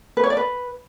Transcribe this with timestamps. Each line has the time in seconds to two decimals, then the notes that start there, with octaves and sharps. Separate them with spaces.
0.17 B4
0.24 C#5
0.30 D5
0.37 B4